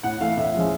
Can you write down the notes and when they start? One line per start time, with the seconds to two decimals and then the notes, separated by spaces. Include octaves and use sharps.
0.03 A2 F#5
0.21 E3 A3 F5
0.37 A2 E5
0.54 F3 G#3 C#4